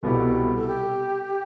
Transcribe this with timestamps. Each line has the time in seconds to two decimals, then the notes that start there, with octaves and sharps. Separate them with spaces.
0.03 C2 B2 B3 E4 G4 A4
0.55 A4
0.68 G4